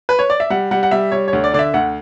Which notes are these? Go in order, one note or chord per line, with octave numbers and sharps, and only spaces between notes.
B4
C#5
D5
E5
G3 F#5
G3 F#5
F#5
G3 E5
G3 C#5
C#5
D2
D5
D3 D5
E5
D2 F#5